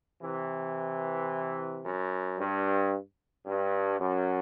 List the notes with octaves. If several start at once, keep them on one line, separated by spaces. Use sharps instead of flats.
C3 E3
F#2
G2
G2
F#2